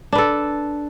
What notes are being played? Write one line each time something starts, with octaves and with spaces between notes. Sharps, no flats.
D4 A4 B4